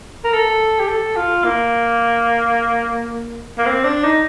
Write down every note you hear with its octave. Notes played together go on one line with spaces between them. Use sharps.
A#4
A4
G4
A4
F4
A#3
A#3
C4
D4
D#4